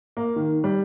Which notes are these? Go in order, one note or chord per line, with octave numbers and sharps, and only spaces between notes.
A#3
D#3
G3